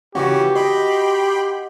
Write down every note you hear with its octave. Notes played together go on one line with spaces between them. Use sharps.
C#3 E3 C#4 F#4 G4
D#5 G5 B5 C6